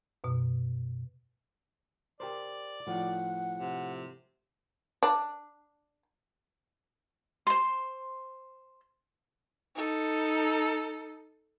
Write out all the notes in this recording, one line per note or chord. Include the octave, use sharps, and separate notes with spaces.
F#2 B2
G4 A#4 C5 D5
A2 F3 F#5
C3
D4
C5 C6
D#4 A4